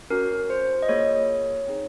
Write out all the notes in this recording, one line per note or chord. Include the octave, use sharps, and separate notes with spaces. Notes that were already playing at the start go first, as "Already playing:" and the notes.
C#4 F#4 A#4
C5
D#5
A#3 F4 G#4 C#5
C4 D#4 G#4